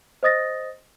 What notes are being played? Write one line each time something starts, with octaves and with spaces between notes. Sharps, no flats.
C5 D#5 D#6 A6 A#6